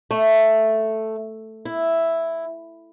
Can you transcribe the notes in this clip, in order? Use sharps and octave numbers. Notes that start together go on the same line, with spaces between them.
A3
E4